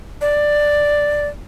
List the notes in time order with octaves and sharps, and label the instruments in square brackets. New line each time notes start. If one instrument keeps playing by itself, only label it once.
[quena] D5